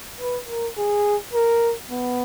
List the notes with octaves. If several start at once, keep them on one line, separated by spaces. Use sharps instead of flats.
B4
A#4
G#4
A#4
B3